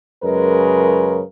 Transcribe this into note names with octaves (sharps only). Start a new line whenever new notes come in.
F#2 C#3 G#3 A#4 B4